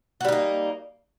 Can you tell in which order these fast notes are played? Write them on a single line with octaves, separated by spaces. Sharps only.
F#4 G3 D#4 A#3